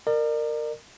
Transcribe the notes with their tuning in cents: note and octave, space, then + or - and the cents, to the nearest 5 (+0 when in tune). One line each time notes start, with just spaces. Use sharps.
A#4 -15 D5 +40